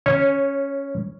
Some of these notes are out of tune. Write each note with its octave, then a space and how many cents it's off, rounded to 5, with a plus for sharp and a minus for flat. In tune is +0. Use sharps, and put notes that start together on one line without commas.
C#4 +0 C#5 -20